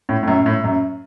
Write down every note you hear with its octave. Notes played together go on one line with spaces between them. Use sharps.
A2
A2
F#2
A2
F#2